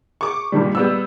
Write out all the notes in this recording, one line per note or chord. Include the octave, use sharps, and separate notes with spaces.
C#6 D6
G2 A#2 D#3 G3
G3 B3 E6